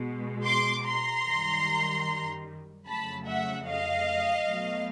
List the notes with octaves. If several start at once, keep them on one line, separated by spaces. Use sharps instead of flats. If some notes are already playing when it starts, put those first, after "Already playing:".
Already playing: B2 G#3
C6 D6
A#5 C6
F#2 D#3 G3
F2 C#3 F#3 A3 A5 B5
E5 F#5
D#5 F5
B2 F#3 A3